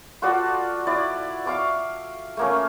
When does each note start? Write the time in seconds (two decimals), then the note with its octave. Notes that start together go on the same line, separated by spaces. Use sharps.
0.22 F4 F#4 A4 D5
0.87 E4 D5
1.46 F5 C#6 D6
2.37 A3 A#3 C#4